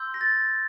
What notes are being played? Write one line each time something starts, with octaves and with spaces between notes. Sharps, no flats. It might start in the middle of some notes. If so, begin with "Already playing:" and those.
Already playing: C6 E6 G6
A#6
A6